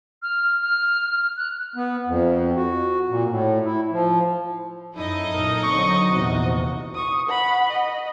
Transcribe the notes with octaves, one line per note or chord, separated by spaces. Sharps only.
F6
F6
F#6
B3
F2
F#4
A#2
A2
E4
F3
F#2 D#4 E4 A4 D#5
B1 A#2 A#4
D3 F#3 C4 C#6
A#1 E2 C3 F#4
C#6 D#6
F#5 B5
D#5